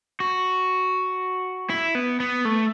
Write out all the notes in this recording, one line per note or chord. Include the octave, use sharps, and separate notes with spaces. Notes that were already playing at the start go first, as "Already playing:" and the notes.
F#4
E4
B3
B3
A3